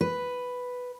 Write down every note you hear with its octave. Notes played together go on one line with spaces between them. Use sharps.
B4